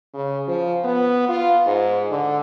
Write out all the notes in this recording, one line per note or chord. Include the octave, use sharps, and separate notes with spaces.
C#3
F3
B3
F4
G#2
D3